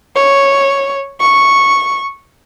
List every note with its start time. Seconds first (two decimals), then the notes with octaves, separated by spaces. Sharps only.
0.16 C#5
1.21 C#6